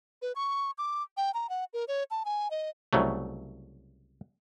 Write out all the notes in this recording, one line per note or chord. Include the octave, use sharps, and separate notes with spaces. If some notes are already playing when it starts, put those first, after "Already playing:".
B4
C#6
D6
G5
A#5
F#5
A#4
C#5
A5
G#5
D#5
C2 C#3 F#3 A3